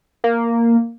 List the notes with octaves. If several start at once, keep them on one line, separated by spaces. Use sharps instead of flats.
A#3